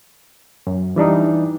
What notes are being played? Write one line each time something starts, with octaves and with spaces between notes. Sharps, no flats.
F#2
E3 G3 D4 D#4